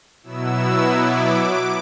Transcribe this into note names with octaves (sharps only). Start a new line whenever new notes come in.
B2 F#3 B3 E4 E6
D6